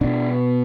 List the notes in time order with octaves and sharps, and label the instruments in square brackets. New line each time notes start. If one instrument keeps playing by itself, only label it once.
[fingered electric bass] B2 D4